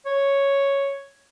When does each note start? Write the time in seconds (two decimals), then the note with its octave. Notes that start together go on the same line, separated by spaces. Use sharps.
0.06 C#5